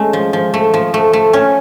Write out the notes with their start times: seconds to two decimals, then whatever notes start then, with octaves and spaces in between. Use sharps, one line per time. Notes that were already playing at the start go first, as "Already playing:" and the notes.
Already playing: G#3 A3 C#4
0.13 F3
0.33 F3
0.54 A3
0.74 F3
0.94 A3
1.13 A3
1.33 C#4